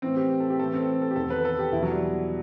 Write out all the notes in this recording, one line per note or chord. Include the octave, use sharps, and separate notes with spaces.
A2 E3 C4
G4
A4
G4
A2 E3 A4
C4
A4
G4
E2 D#3 A4
B4
A4
G4
E2 B2 E4
F#3
G3